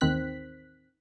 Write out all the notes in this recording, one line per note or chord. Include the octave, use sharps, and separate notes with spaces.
A1 D#2 D#3 C4 F#6 B6